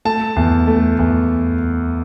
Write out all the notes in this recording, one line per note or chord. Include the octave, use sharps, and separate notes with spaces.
A3 A5
E2
A3
E2